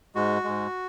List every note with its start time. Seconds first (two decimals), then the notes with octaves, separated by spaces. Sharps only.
0.15 G#2 G#3 F#4
0.44 G#2 G#3